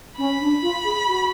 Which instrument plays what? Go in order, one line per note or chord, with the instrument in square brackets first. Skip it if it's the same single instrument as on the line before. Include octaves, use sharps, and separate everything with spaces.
[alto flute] C#4 [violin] B5
[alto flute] D4
F4
G#4
F#4